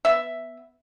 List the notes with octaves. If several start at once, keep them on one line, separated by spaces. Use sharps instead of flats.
B3 E5